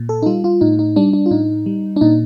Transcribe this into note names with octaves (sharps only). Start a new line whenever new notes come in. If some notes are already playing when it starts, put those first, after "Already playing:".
Already playing: A#2
A4
D#4
G3 F4
F4
A2 D#4
D#4
G3 D4
D4
F4
A2 D#4
G3
D4
A#2 D#4